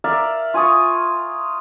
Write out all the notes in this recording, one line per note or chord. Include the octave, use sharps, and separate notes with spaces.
A#4 D5 E5 F5
F4 G#5 C#6 D#6